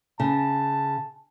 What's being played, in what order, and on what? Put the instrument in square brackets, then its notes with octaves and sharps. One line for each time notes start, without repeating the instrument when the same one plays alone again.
[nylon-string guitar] C#3 [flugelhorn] A5